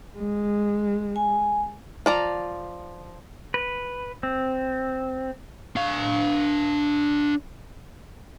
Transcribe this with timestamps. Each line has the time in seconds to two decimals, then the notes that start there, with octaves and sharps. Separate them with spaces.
0.17 G#3
1.16 G#5
2.06 F3 D5 A#5
3.54 B4
4.23 C4
5.76 D4 F5